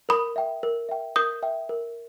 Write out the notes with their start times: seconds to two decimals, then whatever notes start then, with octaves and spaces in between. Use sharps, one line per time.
0.09 A#4 B5 D#6
0.36 E5 G5
0.63 A#4
0.89 E5 G5
1.16 A#4 D#6 G6
1.43 E5 G5
1.69 A#4